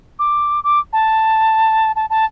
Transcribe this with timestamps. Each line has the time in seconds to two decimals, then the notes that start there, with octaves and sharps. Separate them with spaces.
0.19 D6
0.64 D6
0.93 A5
1.96 A5
2.10 A5